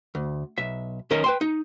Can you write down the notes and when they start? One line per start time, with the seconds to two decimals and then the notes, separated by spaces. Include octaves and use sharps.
0.15 D2
0.58 B1 E5
1.11 B1 D#3 C#4 A#4 D#5
1.24 B4 G5 C6
1.41 D#4